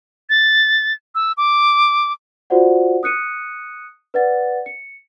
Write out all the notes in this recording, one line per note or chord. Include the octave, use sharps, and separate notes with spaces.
A6
E6
D6
F4 F#4 C5 D5 F#5
D#6 F#6 C#7 D#7
B4 D5 F#5 A6
C#7